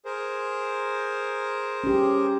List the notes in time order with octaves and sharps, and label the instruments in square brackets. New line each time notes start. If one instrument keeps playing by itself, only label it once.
[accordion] G#4 A#4 C5
[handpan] C#4 G4